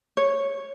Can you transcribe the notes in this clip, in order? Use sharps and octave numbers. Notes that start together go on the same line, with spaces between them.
C#5